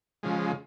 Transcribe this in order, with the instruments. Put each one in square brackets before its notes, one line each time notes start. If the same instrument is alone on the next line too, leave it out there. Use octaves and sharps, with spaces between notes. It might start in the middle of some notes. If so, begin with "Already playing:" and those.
[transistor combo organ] C#3 F3 G#3